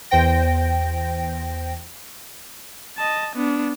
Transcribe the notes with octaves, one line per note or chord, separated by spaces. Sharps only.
E2 C5 G5 A#6
D#5 A5
B3 D4